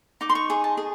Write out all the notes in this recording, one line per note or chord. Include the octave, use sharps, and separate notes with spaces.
D#4 D6
C6
C#6
G#4
A5
G#4